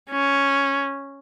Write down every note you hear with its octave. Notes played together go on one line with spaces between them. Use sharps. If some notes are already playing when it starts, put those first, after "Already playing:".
C#4